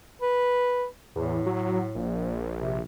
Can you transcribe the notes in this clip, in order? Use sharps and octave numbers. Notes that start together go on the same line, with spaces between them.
B4
E2 A2
F#3
A#1
C3